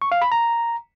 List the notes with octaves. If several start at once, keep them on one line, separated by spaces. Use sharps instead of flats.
C#6
F5
B5
A#5